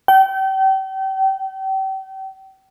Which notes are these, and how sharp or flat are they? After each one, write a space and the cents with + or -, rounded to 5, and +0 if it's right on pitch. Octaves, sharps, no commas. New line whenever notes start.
G5 -35